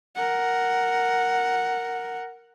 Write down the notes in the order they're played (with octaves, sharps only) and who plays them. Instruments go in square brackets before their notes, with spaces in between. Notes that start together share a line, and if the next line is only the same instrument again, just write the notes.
[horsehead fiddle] A#4 F#5